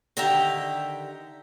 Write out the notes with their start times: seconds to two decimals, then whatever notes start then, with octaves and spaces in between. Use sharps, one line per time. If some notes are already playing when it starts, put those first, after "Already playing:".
0.17 D3 D#3 G4 E5 G5 A#5